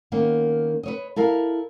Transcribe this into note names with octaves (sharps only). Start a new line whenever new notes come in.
D#3 A#3 B3 C#4
B4 C#5 D#5
E4 A4 A#4 F5